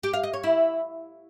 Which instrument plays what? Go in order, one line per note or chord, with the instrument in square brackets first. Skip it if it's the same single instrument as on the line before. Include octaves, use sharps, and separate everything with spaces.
[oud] G4
F5
D#5
C#5
E4